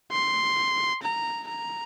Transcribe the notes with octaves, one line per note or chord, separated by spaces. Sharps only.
C6
A#5
A#5